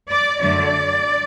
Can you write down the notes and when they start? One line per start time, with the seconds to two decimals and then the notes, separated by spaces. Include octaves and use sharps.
0.11 D5
0.40 F#2 D3 F#3 A3 D5